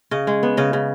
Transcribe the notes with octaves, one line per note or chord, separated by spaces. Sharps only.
C#3 D#5
G#3
B3
C#3 D#5
C#3